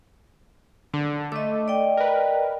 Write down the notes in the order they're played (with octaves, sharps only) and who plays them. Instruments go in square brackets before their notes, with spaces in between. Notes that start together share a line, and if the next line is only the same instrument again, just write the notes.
[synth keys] D3 [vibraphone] D4
[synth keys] A3 [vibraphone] D#5 D6
[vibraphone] D5 D#5 G5
[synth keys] A#4 B4